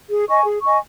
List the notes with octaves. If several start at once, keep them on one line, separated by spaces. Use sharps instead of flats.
G#4
D#5 G#5 C#6
G#4
D#5 G#5 C#6